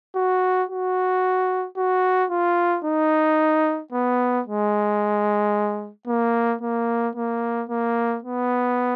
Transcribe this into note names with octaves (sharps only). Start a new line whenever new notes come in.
F#4
F#4
F#4
F4
D#4
B3
G#3
A#3
A#3
A#3
A#3
B3